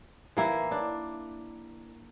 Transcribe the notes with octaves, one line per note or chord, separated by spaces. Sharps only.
E3 A#3 E4
D4